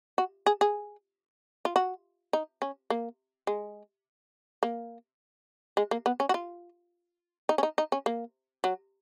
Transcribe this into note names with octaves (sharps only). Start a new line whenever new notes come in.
F#4
G#4
G#4
F4
F#4
D#4
C#4
A#3
G#3
A#3
G#3
A#3
B3
C#4
F#4
F4
D#4
C#4
D#4
D#4
C#4
A#3
F#3